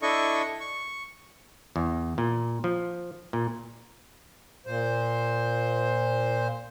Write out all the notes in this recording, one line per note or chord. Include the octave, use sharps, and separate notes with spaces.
D4 E4 A4 D#5 C#6
C#6
E2
A#2
F3
A#2
A#2 C5